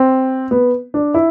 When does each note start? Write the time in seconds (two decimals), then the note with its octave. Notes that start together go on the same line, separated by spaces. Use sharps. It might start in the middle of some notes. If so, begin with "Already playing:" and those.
Already playing: C4
0.51 B3
0.94 D4
1.14 E4